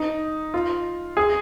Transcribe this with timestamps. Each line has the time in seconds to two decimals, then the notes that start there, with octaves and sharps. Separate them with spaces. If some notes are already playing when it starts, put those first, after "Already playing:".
Already playing: D#4
0.54 F4
1.17 G#4